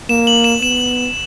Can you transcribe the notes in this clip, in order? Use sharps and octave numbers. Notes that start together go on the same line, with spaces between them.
A#3 E7
F#7
E7
B3 E7